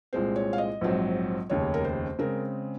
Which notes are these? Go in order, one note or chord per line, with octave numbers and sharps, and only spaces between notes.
C2 A#2 G#3 C4 C5
C#5
F5
D#5
A#1 G#2 F#3 C4
F1 D#2 C#3 C#5
A#4
C5
C#3 G#3 C4 A#4